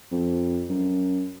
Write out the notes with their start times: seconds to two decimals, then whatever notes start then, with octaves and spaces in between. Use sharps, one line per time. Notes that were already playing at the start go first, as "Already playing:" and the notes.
0.12 F2
0.69 F#2